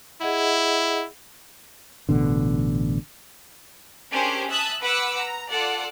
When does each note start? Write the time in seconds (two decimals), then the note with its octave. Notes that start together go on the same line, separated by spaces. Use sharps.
0.21 E4 G#4 D#5 F#5
2.09 A1 B2 D3
4.12 C#4 D4 G4 G#4 A#4 C5
4.50 E5 A5 D#6 E6 F#6
4.81 B4 F#5 B5 D6 E6 F#6
5.17 A#5
5.49 F4 A4 D5 F#5